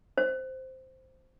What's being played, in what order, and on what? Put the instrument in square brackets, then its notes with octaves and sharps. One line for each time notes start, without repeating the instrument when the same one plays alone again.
[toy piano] C5